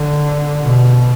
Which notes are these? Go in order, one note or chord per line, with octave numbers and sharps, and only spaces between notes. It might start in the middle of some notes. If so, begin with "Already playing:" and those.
Already playing: D3
B2